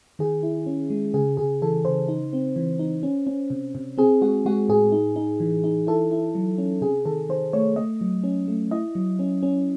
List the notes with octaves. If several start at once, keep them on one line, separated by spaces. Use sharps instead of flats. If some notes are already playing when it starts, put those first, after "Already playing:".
D#3 G#4
E4
C#4
G#3
C#3 G#4
C#3 G#4
E3 A4
C#3 C5
D#4
C4
E3
D#4
C#4
C#4
C3
C3
C4 G#4
G#3 F#4
G#3 F#4
A2 G#4
D#4
D#4
E3
D#4
E4 A4
E4
F#3
C#4
C3 G#4
D#3 A4
D#3 C5
A3 C#5
A3 D#5
F#3
C#4
A3
E4 D#5
F#3
C#4
C#4